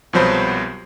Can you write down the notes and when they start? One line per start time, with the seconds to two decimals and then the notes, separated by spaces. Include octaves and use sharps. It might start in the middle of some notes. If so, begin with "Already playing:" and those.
0.13 C2 B2 F3 F#3 C5 B5